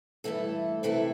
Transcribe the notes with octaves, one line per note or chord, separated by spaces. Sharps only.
G2 E3 A3 E4 A4
C3 E3 A3 E4 A4